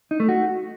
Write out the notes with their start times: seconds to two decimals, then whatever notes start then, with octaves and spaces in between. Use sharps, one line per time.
0.11 D#4
0.20 A3
0.29 F#4